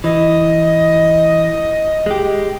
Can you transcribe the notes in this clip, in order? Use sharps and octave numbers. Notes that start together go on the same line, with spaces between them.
E3 D#5
G#3 G4